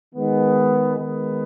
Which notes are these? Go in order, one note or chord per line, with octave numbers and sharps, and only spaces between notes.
D#3 G#3 B3
D#3 G#3 B3